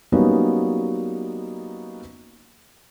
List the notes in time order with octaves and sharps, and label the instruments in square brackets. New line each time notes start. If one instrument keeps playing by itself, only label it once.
[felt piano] F#3 G3 A#3 B3 C#4 D#4